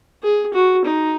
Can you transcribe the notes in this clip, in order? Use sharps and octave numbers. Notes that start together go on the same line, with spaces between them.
G#4
F#4
D#4